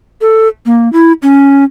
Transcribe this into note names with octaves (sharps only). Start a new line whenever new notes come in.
A4
A#3
E4
C#4